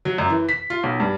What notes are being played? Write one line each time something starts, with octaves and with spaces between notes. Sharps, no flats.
F#3
F#2
E3
B6
F4
B1
G2